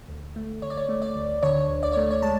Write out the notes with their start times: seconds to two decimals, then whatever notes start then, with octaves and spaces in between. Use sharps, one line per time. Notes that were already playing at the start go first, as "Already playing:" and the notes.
0.08 D2
0.36 A3
0.62 D2 C#5
0.70 D5
0.77 C#5
0.89 A3
1.02 D5
1.16 D2
1.43 D3 C#5
1.70 D2
1.83 D5
1.93 C#5
1.97 A3
2.11 C#5
2.22 G#3 A5